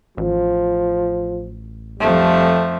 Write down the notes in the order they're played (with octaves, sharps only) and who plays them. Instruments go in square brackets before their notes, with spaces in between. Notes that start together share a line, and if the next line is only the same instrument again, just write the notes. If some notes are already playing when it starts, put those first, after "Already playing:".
[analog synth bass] A1 [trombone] F3
[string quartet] F2 F3 A3 [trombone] G3